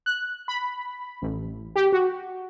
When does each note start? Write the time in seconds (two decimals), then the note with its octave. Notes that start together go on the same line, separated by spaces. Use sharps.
0.06 F#6
0.48 B5
1.22 A1
1.76 G4
1.92 F#4